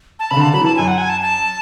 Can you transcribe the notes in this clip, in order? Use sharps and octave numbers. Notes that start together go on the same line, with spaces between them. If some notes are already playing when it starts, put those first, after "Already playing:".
A5
C#3 B5
D3 A5
F#3 B5
E3
A5
F#2 G#5
F#5
G#5
A5
A5